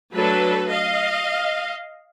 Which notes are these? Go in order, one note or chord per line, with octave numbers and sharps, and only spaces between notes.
F#3 A3 D4 A4 B4
D#5 F5